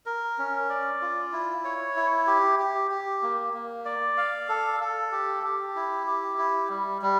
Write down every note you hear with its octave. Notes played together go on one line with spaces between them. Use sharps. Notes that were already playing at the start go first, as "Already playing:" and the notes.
A#4
C#4
D5
F4
E4
C#5
E4
G4
G4
G4
A#3
A#3
D5
F5
A4
A4
G4
G4
E4
G4
E4
G3
G3